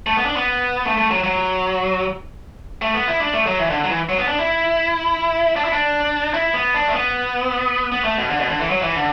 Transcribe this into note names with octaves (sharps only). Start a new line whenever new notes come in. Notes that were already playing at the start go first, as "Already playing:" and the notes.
A3
B3
D4
B3
A3
A3
F#3
F#3
A3
B3
E4
D4
A3
F#3
E3
D3
F#3
E3
F#3
B3
D4
E4
D4
E4
D4
E4
B3
D4
A3
B3
B3
A3
B2
D3
B2
D3
E3
F#3
E3
D3